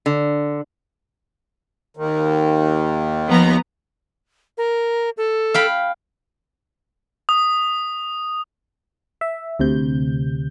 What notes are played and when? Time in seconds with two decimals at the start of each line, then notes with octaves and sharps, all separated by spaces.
0.06 D3
1.97 D#2 D#3
3.27 F3 B3 A#5
4.58 A#4
5.17 A4
5.54 F5 G5 B5
7.29 D#6
9.21 E5
9.59 D2 C3 G6